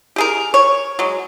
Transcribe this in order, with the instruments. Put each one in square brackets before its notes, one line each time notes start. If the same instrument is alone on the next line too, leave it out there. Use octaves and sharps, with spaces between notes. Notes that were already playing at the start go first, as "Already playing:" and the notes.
[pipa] G4 G#4 A#4
C#5
F#3 G#3